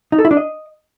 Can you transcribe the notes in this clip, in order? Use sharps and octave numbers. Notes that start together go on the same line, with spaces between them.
D#4
A4
E4
D4
D#5